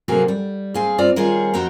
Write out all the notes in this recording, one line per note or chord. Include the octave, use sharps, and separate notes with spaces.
C3 F#3 A#3 F#4 G#4 A4
G3
C4 G#4 F5
G2 C4 F4 D5
D#3 G3 C4 F4 G#4 C#5
F2 F#4 C5 G5 A#5